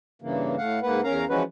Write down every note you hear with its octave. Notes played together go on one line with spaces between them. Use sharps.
G2 C#3 E3 A#3
A2 A3 F5 F#5
G#2 A#3 B4 F#5
E2 C#4 A#4 F5 A#5
E3 F3 G#3 C#4 F#4 B4